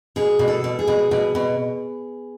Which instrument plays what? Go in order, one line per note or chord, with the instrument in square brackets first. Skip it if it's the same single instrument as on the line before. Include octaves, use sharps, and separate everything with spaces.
[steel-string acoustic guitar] B2 G#4
B2
A4
B2
G#4
B2
B2
B2